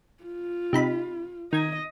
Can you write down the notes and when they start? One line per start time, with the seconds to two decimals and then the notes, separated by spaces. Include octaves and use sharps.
0.24 F4
0.73 C3 D#4 B5
1.53 D#3 D#5 G#6